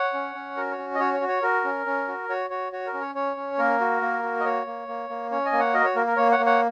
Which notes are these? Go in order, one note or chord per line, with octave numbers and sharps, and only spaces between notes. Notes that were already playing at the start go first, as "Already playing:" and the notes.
Already playing: C#5 F#5
C#4
C#4
F#4 A#4
C#5
C#4
D#5
F#4 C#5
C#5
F#4
C#5
F#4 A#4
C#4
C#4
F#4
F#4 C#5
F#4 C#5
F#4 C#5
A#4
C#4
C#5
C#4 C#5
C#4
A#3 A#4
F#4
A#3
F#4
D#5
A#3 C#5
A#3
A#3
A#3
C#4 C#5
D#5 G#5
A#3
C#5 F#5
F#4 A#4 D#5
C#5
A#3 A#4
A#4
A#3 C#5
C#5 F#5
A#3
C#5 F#5